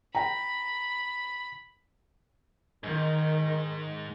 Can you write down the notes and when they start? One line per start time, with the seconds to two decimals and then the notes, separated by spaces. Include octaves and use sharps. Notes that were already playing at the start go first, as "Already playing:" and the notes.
0.15 G5 A#5 B5
2.84 G#2 D#3